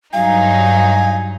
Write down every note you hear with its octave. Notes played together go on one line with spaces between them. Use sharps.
G2 F#3 D#4 F5 G#5